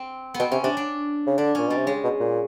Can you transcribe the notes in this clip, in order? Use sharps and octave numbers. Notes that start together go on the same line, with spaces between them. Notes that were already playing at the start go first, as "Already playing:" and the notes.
Already playing: C4
B3
B2 C4
C3 C#4
C3 D4
D4
C#3
D3 D4
A#2 C#4
B2 G3
C3
C#3 G#3
B2
A#2